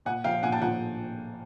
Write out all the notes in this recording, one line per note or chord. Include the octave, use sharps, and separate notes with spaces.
A#2 F#5 G#5
F3 F5 G5
A#2 F#5 G#5
G5 A5
F3 F#5 G#5